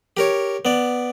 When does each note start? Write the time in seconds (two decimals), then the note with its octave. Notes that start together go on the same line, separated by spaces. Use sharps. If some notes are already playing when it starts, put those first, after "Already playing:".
0.17 G4 A#4 C#5
0.65 B3 D5